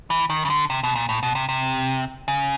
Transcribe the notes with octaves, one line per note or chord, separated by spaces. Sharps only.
E3
D#3
C#3
D3
C3
B2
A#2
A2
B2
C3
C3
C#3